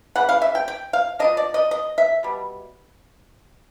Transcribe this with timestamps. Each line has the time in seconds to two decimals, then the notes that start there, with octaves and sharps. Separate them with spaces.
0.16 C#3 E3 F#5
0.29 F5
0.42 E5
0.55 G5
0.68 G5
0.93 F5
1.19 F3 A#3 D4 D#5
1.37 D5
1.54 D#5
1.71 D#5
1.98 E5
2.23 B2 G3